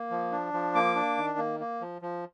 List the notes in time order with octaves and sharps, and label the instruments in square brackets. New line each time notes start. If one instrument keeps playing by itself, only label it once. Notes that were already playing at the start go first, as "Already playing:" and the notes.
Already playing: [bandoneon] A#3
F3
D4
F3
A#3 D6
D4
D#3
A#3
A#3
F3
F3